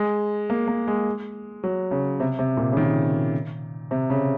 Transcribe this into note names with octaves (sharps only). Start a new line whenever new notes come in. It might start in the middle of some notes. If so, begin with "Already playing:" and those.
Already playing: G#3
A#3
A#3
G#3
F#3
C#3
C3
C3
A#2
C#3
D#3
C3
C#3